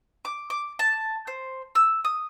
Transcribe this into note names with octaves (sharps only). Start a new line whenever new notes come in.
D6
D6
A5
C5
E6
D#6